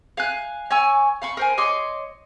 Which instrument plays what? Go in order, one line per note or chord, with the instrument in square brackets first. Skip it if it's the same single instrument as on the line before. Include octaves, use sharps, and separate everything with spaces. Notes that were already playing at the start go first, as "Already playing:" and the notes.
[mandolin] F5 G#5 F#6
C#5 G#5 C#6 E6
F5 B5 C#6
A#4 C5 G#5
C#5 D#5 C6 D6